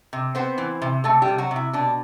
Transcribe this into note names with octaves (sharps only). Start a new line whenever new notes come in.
C3
B3 C4 C5
E3
C3
C3 A3 A4
G3 G4
C3
F#3 F#4
C3 E4
B2 D4